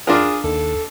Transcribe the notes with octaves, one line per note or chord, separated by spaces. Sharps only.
D4 F4 G#4 A#4
D#2 A4